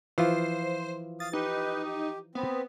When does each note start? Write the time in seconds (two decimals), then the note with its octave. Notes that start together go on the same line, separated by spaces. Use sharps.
0.18 E3 F3 F4 C5
1.20 F5 D#6 A6
1.33 D#4 G4 B4
1.84 G4
2.35 B3 C4